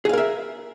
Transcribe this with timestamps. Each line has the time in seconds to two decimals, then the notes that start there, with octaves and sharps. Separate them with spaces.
0.05 G#4
0.09 F5
0.13 A#4
0.18 E5